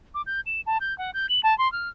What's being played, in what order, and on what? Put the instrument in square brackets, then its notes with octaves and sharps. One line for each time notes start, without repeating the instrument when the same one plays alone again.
[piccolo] D6
G6
E7
A5
G6
F#5
G6
F#7
A5
C6
F6